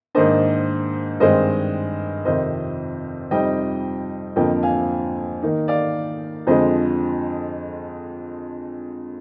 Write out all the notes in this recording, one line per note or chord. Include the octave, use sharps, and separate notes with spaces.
G#2 D#3 A#3 D4 C5 D#5
G2 D#3 G#3 C4 C5 D#5
F2 C3 D#3 C5 D#5
F2 C3 G3 C4 D#4 D#5 G5
F2 D3 F3 A#3 D#5 G5
F5 G#5
D#3 A#3 D#4
D5 F5
F2 D3 F3 G#3 C5 D#5